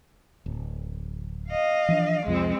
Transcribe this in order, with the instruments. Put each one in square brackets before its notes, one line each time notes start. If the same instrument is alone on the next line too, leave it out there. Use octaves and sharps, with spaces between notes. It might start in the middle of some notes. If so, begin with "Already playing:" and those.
[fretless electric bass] D1
[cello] D#5 F5
[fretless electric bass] E3 F3 D4
[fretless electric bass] C2 F2 F3 [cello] G#3 C4